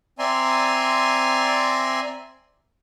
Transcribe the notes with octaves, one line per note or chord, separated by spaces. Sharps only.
C4 D5 E5 G#5 A#5 C6